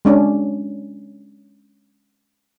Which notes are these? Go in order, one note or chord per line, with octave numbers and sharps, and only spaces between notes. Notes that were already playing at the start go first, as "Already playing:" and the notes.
G#3 C#4 D4